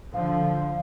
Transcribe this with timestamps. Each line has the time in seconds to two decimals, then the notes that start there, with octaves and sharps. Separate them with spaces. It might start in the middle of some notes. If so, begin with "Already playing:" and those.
0.14 D3 F3 F5